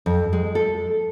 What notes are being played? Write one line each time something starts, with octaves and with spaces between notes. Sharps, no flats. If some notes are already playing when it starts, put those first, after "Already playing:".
F2
G#3
A4